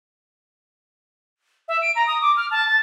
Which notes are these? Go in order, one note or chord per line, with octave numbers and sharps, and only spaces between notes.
E5
D7
A#5
D#6
D6
F6
A5
A6